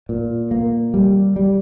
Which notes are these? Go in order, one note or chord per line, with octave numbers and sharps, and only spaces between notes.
A#2
A#3
G3
G3